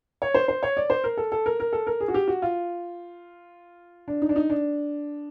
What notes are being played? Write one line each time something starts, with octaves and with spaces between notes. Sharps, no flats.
C#5
C5
C5
C#5
D5
C5
A#4
A4
A4
A#4
A#4
A4
A#4
G#4
F#4
G4
F#4
F4
D4
D#4
D4
D#4
D4